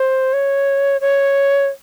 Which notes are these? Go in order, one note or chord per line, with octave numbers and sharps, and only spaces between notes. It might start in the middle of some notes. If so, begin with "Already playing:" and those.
Already playing: C5
C#5
C#5